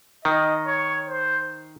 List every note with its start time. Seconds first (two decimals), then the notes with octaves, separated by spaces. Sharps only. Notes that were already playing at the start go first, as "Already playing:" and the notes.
0.24 D#3 D#5
0.67 C#5
1.09 C5